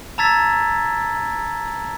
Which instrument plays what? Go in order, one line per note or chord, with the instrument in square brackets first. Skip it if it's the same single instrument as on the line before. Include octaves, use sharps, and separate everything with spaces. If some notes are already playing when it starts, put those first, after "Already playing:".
[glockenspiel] A5 A#5 E6 G#6 A6 B6